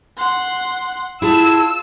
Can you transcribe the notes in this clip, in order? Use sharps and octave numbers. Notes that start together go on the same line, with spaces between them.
F#5 C6
E4 F4 G#4 A5 E6